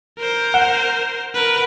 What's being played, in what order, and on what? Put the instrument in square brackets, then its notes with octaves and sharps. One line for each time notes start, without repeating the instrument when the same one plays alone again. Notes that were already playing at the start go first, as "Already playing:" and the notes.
[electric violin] A#4 C5
[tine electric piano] F#5
[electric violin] A#4 B4